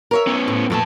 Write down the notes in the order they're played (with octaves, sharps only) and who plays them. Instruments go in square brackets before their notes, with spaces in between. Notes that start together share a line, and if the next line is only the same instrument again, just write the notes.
[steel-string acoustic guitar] A#4 C#5 E5
[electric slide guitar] B3 C#4
[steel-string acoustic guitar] A2
[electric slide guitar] F2 A5 [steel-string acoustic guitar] A#2 A3 B3